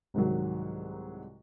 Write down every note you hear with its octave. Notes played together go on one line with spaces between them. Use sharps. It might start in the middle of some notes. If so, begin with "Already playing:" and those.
C2 G#2 D#3 F#3